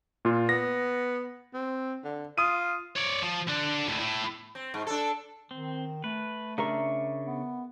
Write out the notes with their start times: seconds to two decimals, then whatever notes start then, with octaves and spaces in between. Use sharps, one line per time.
0.25 A#2 F4
0.49 B3 A#6
1.54 C4
2.04 D3
2.38 F4 D#6 D#7
2.96 C#5 D5
3.22 F3
3.48 D3 D4
3.86 D2 A2
4.00 A2
4.55 C4
4.74 G#2
4.87 D4 A4
5.51 D#3 C4
6.04 A3 B4
6.58 C#3 D4 A#4 E5 C#6
7.27 B3